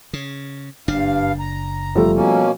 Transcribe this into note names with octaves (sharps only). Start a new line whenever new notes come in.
C#3
F#1 G2 D4 F5
A#5
F3 G3 A3
B2 A#3 C#4